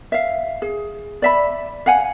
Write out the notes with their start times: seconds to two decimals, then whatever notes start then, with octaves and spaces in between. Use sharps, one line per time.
0.12 E5 F5
0.62 G#4
1.22 D5 E5 B5
1.86 F5 F#5 G#5